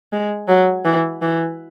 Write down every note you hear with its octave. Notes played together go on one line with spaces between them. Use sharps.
G#3
F#3
E3
E3